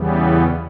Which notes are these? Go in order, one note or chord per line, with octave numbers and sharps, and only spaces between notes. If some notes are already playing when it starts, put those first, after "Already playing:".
Already playing: E2 C#3 E3 G3 B3